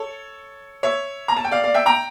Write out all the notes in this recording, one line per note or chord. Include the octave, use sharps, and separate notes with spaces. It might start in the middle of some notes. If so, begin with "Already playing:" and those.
Already playing: A4 C#5
C#5 E5
A#5
A5
G5
D5 F5
D5 F5
E5 G5
G5 A#5